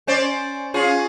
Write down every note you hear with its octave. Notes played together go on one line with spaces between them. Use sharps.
C#4 C5 D5
C#4 F4 G#4